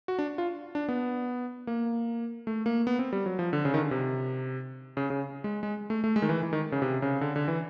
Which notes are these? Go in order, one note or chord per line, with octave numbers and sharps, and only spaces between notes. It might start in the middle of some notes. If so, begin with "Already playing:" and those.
F#4
D4
F4
D4
B3
A#3
A3
A#3
B3
C4
G3
F#3
F3
D3
C#3
D#3
D3
C3
C#3
C#3
G#3
G#3
A3
A3
G#3
D#3
E3
E3
D#3
C#3
C3
C#3
D3
D3
E3